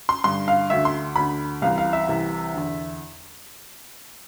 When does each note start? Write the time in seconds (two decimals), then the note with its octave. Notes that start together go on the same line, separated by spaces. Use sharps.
0.09 C6
0.24 G2 D3 C6
0.48 F5
0.70 D2 D3 E5
0.85 C6
1.16 D2 D3 B5
1.62 C2 C3 E3 F5
1.78 F5
1.93 E5
2.08 C2 C3 E3
2.53 E2 D3